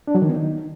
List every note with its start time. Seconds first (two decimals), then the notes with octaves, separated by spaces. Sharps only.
0.08 D4
0.15 F#3
0.22 D#3
0.29 B3
0.36 D#4